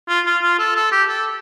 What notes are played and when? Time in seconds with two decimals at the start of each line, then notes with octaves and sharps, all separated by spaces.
0.09 F4
0.26 F4
0.42 F4
0.59 A4
0.76 A4
0.92 G4
1.09 A4